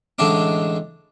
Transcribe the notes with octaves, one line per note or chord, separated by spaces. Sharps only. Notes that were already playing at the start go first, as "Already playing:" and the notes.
A1 D3 G#3 D4 D6